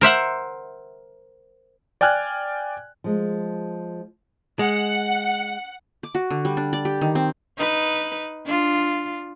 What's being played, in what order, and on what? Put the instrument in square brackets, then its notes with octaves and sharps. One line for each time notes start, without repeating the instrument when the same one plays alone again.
[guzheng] A#4 C5 E5 F#5
[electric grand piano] D5 G5 G#5 F6 F#6 G#6
[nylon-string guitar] F3 G#3
[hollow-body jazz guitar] G#3 [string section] F#5
[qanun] D6
F#4
D3
G3
D4
D5
G4
D#3
C4
[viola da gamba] D#4 B4
D4 F4